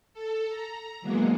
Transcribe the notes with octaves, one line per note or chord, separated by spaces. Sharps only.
A4
A#5
D3 E3 F#3 G#3 A#3 B3